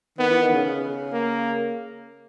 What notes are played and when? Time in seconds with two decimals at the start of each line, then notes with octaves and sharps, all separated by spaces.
0.18 D#3 B3
0.30 E3
0.42 D#3
0.54 C#3
0.65 C#3
1.13 A#3